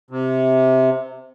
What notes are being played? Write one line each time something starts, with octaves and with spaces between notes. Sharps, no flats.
C3